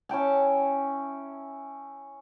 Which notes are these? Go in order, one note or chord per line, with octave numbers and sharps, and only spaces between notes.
C#4 E4 G5 A5